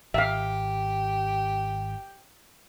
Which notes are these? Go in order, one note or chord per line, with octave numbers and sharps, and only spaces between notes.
G#1 G4 E5 F5